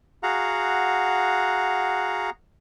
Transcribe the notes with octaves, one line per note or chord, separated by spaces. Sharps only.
F#4 G#4 F5 F#5 A#5